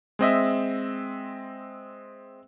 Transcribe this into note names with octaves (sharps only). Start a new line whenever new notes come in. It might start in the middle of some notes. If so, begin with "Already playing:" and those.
G#3 C4 D#5 E5